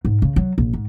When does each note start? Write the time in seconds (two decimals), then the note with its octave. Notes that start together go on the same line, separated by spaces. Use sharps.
0.05 G#2
0.22 C#3
0.36 F#3
0.58 A#1
0.73 G#2